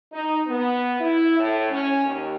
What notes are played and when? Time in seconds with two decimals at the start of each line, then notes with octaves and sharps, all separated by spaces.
0.12 D#4
0.47 B3
0.99 E4
1.39 A2
1.70 C#4
2.04 D#2